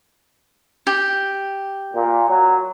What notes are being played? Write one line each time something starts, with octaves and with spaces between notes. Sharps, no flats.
G4
A#2
F#3